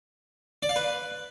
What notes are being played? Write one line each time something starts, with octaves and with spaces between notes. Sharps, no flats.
D5
F5
B4